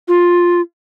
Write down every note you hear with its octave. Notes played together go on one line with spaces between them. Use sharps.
F4